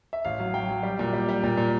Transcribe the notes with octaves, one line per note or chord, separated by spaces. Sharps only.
E5
A1 F5
F#3
F#3 G5
F#3
G3
A#2
G3
G3
A#2
A#2